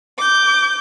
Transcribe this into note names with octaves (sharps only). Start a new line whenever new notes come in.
D6 G6